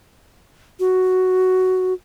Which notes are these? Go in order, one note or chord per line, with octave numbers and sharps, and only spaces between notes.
F#4